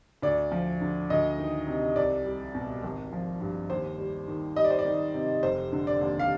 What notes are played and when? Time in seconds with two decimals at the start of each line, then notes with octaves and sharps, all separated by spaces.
0.22 D2 D5
0.51 F3
0.81 D3
1.10 D2 D#5
1.38 D#3
1.67 C3
1.96 C2 D5
2.25 G3
2.55 B2
2.84 G#1
3.12 F3
3.41 G2
3.70 D#2 C5
3.98 G3
4.28 D#3
4.56 G3 D#5
4.64 D5
4.70 C5
4.79 D5
4.85 D#3
5.14 C3
5.43 F1 C5
5.73 D3
5.87 D5
6.01 D#2
6.19 F5